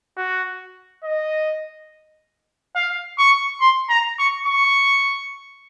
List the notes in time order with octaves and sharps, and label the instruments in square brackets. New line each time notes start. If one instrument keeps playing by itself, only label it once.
[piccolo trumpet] F#4
D#5
F5
C#6
C6
A#5
C#6
C#6